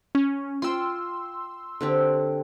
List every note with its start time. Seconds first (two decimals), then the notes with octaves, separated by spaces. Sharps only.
0.15 C#4
0.62 F4 G5 C6 E6
1.81 D3 C4 G4